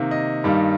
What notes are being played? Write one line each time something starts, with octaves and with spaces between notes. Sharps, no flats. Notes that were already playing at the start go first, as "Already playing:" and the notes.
Already playing: C3 D#3 A#3
D#5
G2 D#3 G3 A#3